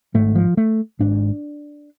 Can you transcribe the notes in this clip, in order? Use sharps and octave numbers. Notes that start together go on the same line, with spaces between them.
G#1 G#2 A3
F3
A3
G#1 G#2 D4